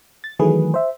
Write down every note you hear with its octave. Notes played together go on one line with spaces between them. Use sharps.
A6
D#3 E3 F#3 A3 G#4 B4
C5 E5